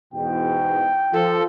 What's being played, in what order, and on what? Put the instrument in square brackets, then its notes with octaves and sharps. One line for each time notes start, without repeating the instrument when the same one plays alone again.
[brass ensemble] E2 G#2 B2 [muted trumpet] G5
[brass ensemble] F3 [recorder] A4